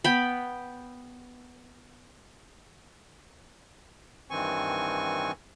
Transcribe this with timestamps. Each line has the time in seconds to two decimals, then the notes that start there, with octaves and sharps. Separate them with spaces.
0.04 B3 G5 B5
4.31 G2 D#3 E3 C4 G#5 C#6